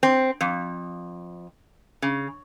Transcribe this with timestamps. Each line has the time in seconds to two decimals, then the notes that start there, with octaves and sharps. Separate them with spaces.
0.03 C4
0.41 F2
2.02 C#3